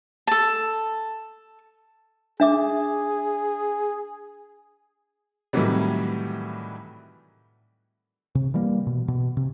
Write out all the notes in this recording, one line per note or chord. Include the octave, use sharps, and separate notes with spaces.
A4 A5
D4 G#4 E5 D6
A2 C3 D#3 E3 F#3 G3
C3
E3 G3 A#3
B2
B2
C3